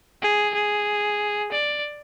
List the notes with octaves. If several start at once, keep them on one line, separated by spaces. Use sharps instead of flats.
G#4
G#4
D5